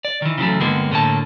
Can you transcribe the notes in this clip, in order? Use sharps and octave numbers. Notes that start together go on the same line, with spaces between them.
D5
D#3 E3
C#3 E3 F#3 A3
G2 D3 G#3 A#3 B3
A2 D3 A#3 A5